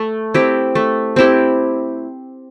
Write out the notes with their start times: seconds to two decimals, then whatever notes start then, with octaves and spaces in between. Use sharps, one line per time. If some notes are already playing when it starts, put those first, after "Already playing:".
Already playing: A3
0.34 C4 E4 G4
0.75 A3
1.16 C4 E4 G4